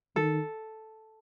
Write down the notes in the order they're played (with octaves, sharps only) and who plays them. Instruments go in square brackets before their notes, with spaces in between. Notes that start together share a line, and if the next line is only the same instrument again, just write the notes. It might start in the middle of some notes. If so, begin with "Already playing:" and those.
[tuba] D#3 [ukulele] A4